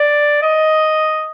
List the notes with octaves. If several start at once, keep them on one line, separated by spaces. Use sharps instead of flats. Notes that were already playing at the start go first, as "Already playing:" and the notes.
Already playing: D5
D#5